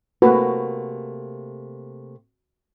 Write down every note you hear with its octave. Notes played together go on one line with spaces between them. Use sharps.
C3 A3 A#3 F#4 B4